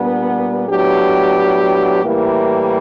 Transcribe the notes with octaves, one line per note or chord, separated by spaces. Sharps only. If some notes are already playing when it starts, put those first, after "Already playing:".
Already playing: A#2 G3 B3 D4
A2 F#3 B3 D4 G4
A2 E3 G3 A#3